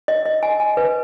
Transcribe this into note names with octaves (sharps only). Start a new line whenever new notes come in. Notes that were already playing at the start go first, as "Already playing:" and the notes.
D#5
D#5
G#5
G#5
B4